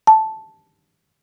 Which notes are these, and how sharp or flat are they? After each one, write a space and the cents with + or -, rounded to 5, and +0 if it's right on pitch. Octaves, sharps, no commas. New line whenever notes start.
A5 -5